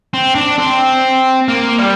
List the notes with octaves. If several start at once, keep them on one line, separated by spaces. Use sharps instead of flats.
C4
D4
C4
A#3
G3